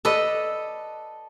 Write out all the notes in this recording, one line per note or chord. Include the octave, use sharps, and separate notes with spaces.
A4 B4 D5 D#5